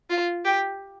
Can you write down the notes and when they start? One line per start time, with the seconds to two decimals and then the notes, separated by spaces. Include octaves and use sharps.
0.10 F4
0.45 G4